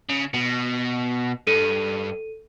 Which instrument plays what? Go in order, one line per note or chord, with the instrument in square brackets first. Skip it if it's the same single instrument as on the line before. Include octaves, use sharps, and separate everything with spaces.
[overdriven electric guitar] C#3
B2
[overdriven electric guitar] G2 [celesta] A4 D#7